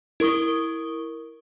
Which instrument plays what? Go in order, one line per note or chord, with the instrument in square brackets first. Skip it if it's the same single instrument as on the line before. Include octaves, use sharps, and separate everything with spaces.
[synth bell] E4 A#4 C#6 D#6 G7